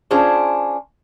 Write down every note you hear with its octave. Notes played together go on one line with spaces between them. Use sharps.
C#4 D4 F4 G#4 C5